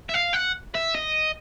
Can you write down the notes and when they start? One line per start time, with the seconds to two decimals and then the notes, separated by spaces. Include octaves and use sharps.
0.09 E5
0.14 F5
0.34 F#5
0.75 E5
0.94 D#5